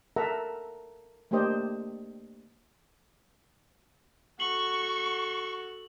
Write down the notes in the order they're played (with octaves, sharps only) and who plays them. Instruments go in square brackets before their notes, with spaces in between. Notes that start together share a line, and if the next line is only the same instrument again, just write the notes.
[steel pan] A4 A#4 E5 F#5 A#5
A3 A#3 D4 G4 C5 D#5
[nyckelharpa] F#4 A4 [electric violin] C#6 [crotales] F#7